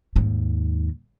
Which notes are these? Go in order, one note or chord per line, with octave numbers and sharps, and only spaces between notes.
D#2 G#2